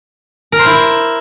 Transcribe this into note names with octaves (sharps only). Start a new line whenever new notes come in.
A#4
C5
E4